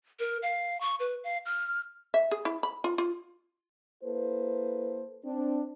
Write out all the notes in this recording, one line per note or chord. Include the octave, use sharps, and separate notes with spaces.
A#4
F5
C#6
B4
F5
F6
E5
G#4
E4
B5
F4
F4
A#3 E4 A4 B4 C5
C4 D4